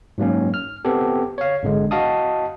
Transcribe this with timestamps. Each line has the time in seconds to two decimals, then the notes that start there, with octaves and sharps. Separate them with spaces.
0.18 G#2 F#3 A#3 C#4
0.54 F6
0.85 B3 C4 G4 A4
1.38 C#5 F5
1.63 G#1 D3 G#3
1.91 F#4 D#5 F5 A5 D#6